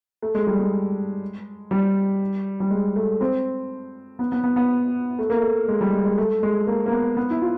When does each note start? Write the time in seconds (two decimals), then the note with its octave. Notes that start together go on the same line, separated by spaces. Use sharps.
0.22 A3
0.35 G#3
0.47 G3
0.59 G#3
1.71 G3
2.60 G3
2.71 G#3
2.96 A3
3.21 C4
4.19 B3
4.32 B3
4.44 B3
4.56 B3
5.19 A3
5.30 A#3
5.41 A3
5.68 G#3
5.81 G3
5.93 G#3
6.05 G#3
6.18 A3
6.43 G#3
6.67 A#3
6.86 A#3
6.92 B3
7.17 B3
7.30 E4
7.42 F4